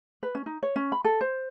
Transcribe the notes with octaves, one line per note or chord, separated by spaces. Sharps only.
B4
C#4
D#4
C#5
C#4
B5
A4
C5